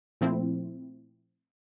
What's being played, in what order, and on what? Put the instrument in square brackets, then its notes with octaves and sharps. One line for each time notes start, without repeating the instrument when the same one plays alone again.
[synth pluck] A#2 F3 A3 C4 E4